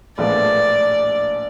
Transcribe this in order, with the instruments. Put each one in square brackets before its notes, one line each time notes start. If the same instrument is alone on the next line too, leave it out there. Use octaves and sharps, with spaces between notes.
[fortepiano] A#1 A2 F3 G#3 B3 [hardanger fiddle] D5